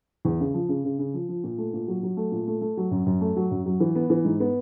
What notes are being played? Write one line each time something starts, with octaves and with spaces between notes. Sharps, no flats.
E2
C#3
F3
C#3
C#3
C#3
F3
F3
A#2
A3
A#2
F#3
F#3
A3
A#2
A3
A3
F#3
F#2
F#2
A3
F#3
F#2
F#3
E3
B3
E3
G#2
B3